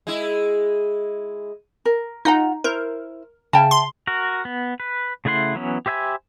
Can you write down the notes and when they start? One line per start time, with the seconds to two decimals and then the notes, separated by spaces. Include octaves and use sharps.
0.07 G#3 E4
1.85 A#4
2.25 D#4 F4 F#5 A#5
2.64 E4 A#4 C5
3.53 C#3 E5 G5 A5
3.71 C6
4.07 F#4 A#4
4.45 B3
4.80 B4
5.25 C#3 A3 E4 F#5 C6
5.55 E3 F#3 B3 C#4
5.86 G4 C5 E5 G#5 B5